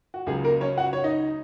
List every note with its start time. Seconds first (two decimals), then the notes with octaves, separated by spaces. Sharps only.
0.14 F#4
0.26 C#2 C#3 F#3 G#4
0.44 A#3 A#4
0.61 C#4 C#5
0.78 F#4 F#5
0.93 C#5
1.04 D#4 D#5